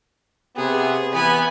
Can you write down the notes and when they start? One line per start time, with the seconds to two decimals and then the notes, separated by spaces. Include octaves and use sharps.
0.57 C3 B3 G#4
1.14 E3 B3 G#5 B5